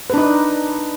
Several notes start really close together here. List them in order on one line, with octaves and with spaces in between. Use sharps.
B4 D4 D#4